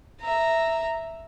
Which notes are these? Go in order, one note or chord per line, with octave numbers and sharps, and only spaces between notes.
E5 A#5